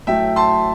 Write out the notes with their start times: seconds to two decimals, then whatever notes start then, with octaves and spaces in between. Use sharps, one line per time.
0.07 A2 F#3 A3 E5 G5
0.36 A5 C6